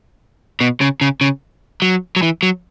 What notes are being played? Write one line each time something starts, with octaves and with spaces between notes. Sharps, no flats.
B2
C#3
C#3
C#3
F#3
F#3
E3
F#3